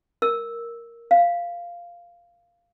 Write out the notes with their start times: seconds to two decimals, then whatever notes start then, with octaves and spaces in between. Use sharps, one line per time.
0.22 A#4 E6
1.11 F5